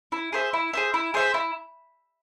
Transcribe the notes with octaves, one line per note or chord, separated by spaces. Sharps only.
E4
G#4 C5 E5
E4
G#4 C5 E5
E4
G#4 C5 E5
E4